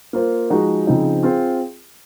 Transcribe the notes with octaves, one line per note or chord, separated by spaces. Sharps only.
A#3 F4 C5
F3 G#3 D#4 F#4
C#3 F3 C4 D#4 G#4
C4 F4 G#4